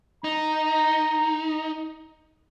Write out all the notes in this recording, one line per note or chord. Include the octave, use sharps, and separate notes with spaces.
D#4 A#5